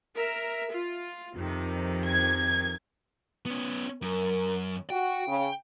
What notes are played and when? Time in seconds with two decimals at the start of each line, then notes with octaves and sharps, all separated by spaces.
0.15 A#4 E5
0.71 F4
1.37 F2 C3 D#3
2.05 G#6
3.46 B3 C#4
4.02 F#2 A#4
4.90 F#4 G5
5.28 C#3